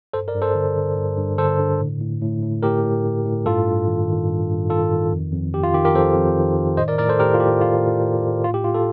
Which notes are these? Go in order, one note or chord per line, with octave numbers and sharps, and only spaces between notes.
G2 A4 C5
A#4 D5
G2
A4 C5
D3
D3
G2
G2
D3 A4 C5
D3
A2
A2
A2
A2
A2 G4 A#4
A2
A2
A2
G2 F4 A4
G2
D#3
D#3
G2
G2
D#3 F4 A4
D#3
F2
F2
D#3 G4
F4
D#3 G4
G4 A#4
F2 A4 C5
F2
D#3
D#3
A2 C5 D#5
A#4 D5
A2 A#4 D5
A4 C5
A2 G4 A#4
F4
A2 G4
A2 F4
A2
A2
A2
A2 F4
G4
A2 F4
F4 A4